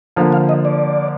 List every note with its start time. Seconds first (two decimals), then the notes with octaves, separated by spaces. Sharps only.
0.16 D3 F3 A#3 F5
0.33 F5
0.49 D#5
0.65 D5